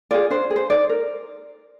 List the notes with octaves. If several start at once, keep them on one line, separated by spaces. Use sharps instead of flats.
F4 G#4 D5
D4 C5
G#4
C5
D#4 D5
A#4